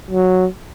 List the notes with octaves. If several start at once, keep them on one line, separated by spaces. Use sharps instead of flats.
F#3